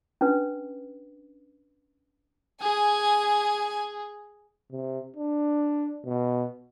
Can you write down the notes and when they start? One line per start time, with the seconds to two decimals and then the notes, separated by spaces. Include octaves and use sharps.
0.21 C#4 D4 B4
2.61 G#4 G#5
4.72 C3
5.16 D4
6.06 B2